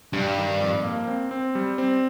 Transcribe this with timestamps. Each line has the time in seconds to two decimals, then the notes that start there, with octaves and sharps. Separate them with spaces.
0.13 G2 G3
0.37 D#3
0.60 F2
0.83 A#3
1.07 C4
1.31 C4
1.55 G3
1.78 C4